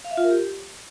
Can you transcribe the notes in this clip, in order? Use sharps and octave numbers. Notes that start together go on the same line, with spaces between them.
F5
E5
F4
A#4
G4